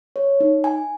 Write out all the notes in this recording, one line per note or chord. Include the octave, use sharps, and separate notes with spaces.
C#5
D#4
G#5